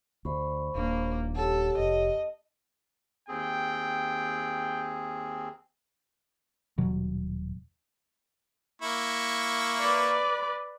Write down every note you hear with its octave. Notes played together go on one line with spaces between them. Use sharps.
D2 C5 B5 C#6
D#1 A#3 D4
G4 A4 C#5 F#5
F1 D#5
D#2 C4 G#4 G5
D#1 B2 F#3
A#3 E4 C#6
B4 D5